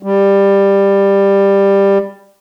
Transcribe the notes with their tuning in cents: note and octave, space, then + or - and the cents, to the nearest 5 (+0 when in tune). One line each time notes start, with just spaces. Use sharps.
G3 +15